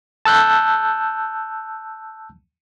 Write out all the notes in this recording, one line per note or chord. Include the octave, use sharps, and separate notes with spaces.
A5 E6 F#6 G6